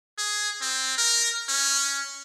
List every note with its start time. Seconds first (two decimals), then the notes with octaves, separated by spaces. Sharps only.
0.18 G#4
0.61 C4
0.98 A#4
1.49 C#4